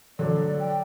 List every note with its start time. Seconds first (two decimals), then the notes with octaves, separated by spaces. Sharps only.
0.19 D3 F#3 D5
0.60 G5